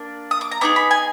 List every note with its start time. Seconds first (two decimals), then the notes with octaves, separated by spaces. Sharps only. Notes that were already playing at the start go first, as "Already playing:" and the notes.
Already playing: A#3 D4
0.31 D#6
0.41 D6
0.51 A#5
0.61 B3 D#4 G#4 D6
0.76 B5
0.91 G#5